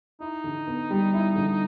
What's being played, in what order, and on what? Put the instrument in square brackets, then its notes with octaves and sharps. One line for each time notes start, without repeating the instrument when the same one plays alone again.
[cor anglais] D#4 [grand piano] E4
[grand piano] D3
B3
G3
E4
D3